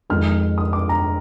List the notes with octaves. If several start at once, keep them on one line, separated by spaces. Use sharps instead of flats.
F2 D#3 G#3 F6
D#6
D6
A#5